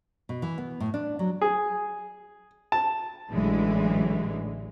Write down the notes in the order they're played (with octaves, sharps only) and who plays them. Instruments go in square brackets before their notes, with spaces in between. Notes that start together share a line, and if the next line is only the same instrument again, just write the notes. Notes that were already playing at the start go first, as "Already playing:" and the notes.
[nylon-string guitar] B2
E3
B3
A2
D4
F#3
[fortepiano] G#4
A5
[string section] A1 D3 E3 F#3 G#3